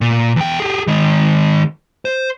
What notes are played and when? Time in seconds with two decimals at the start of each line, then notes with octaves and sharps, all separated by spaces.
0.01 A#2
0.36 E2 G5
0.60 G4 G#4
0.87 D#3 G#3
2.05 C5